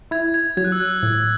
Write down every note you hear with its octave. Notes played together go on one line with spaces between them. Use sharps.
E4 G#6
G#6
F#3 G#6
F#6
E6
F#6
A2